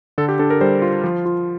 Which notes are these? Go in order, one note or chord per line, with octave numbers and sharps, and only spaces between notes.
D3 A4
G4
D4 A4
A#4
G3 C5
F4
F3
F4